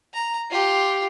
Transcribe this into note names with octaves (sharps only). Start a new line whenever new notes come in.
A#5
F4 G4